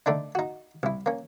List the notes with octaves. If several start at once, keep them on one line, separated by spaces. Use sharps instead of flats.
D3 A3 D4 D#4
D#4 F#4
C2 E4
A#3 C#4